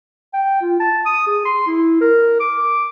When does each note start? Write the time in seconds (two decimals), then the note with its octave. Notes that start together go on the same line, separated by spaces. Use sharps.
0.33 G5
0.62 F4
0.80 A5
1.06 D#6
1.27 G#4
1.45 C6
1.67 E4
2.01 A#4
2.40 D6